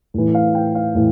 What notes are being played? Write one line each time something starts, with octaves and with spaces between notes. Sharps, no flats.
A2 E3
F5
G5
F5
A2 E3